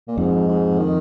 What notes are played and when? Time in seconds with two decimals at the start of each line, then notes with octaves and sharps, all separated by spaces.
0.08 A#2
0.17 F2 G#2
0.48 G#2
0.79 D#3